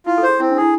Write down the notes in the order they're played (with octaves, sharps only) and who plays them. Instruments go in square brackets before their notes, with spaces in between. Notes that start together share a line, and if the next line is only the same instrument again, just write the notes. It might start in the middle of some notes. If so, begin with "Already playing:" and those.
[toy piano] E4 [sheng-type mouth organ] F4
[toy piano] A4
[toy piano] G#4 [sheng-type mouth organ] C5
[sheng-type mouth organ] C4 [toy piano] E4
[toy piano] D4
[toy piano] E4 [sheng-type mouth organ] G#4